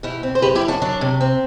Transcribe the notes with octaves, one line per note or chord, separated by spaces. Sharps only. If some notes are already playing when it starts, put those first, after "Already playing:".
B2 E4 G4
C4
C5
F#2 G4 B4
E4 G4
F#2
D4 F#4
F#3 D4
C3
C4